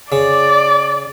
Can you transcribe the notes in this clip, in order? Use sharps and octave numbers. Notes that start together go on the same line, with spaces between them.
C#3 D5